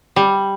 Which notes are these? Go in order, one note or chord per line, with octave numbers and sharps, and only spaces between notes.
G3